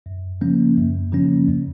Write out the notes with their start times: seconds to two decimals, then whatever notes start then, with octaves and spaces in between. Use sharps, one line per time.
0.06 F#2
0.41 C#3 F3 A#3 C#4
0.77 F#2
1.12 C#3 F3 A#3 C#4
1.48 F2